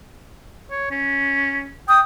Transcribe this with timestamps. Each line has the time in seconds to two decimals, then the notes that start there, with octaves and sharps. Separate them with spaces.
0.71 C#5
0.91 C#4
1.89 G5 D#6